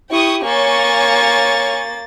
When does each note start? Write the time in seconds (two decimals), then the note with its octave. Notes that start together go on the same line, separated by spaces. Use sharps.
0.11 E4 G4 G5 C#6 D#6
0.45 A#3 C#5 G#5 C#6 A6